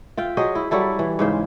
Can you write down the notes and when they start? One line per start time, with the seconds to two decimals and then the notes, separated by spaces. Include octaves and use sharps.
0.17 F4 E5 G5
0.37 F#3 G#4 C5 D#5
0.55 E4
0.71 F#3 G3 E4 A4
0.99 E3
1.19 G#2 C#3 C5